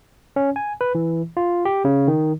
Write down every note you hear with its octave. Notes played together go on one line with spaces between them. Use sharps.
C#4
G#5
B4
E3
F4
G4
C#3
D#3